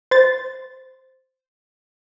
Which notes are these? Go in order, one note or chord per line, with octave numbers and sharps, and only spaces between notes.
C5 A6